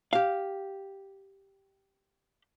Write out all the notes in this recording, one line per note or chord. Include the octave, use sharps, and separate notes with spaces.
G4 F5